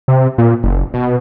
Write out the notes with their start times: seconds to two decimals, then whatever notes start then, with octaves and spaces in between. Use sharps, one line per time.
0.08 C3
0.38 A#2
0.63 F#1
0.94 B2